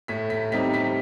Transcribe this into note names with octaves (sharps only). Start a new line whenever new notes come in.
A2 B6
B6
G3 C4 D#4 B6
B6